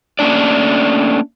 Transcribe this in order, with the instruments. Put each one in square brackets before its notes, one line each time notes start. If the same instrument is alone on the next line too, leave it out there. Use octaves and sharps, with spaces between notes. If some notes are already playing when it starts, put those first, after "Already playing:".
[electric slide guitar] A3 A#3 C#4 D4 D5